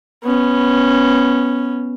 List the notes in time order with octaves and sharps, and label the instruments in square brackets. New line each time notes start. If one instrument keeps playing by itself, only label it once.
[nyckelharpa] B3 C#4